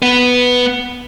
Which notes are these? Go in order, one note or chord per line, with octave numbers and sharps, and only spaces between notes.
B3 B4